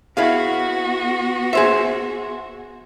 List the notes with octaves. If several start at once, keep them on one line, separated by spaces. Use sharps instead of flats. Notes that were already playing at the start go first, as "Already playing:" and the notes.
B3 E4 F#4 G#4 F5
G#4 C5 E5